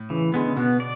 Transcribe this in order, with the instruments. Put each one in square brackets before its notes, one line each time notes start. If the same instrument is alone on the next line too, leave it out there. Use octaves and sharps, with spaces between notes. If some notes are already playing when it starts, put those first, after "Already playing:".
Already playing: [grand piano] A2
[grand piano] C#3 [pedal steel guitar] E3
[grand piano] D3 [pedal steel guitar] G#3 B3
[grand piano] C#3
[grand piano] B2 [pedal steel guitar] B3
[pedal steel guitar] D5